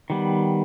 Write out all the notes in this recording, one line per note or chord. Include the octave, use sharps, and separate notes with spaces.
D#3 G3 B3